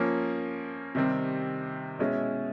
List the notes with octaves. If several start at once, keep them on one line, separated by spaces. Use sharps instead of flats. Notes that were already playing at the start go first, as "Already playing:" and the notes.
Already playing: F3 A#3 C#4
C3 D#3 G3 C4
B2 G#3 C#4 E4